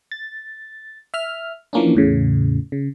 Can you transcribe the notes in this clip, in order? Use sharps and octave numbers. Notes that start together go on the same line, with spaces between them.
A6
E5 F6
E3 F3 A#3 C#4 D4
E2 A2 C#3
C#3